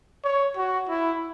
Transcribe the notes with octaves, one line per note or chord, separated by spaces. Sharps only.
C#5
F#4
E4